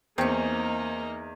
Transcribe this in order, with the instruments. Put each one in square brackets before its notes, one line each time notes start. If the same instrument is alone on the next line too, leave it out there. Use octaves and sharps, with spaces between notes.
[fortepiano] E2 [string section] A#3 D#4 [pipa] C4 C#4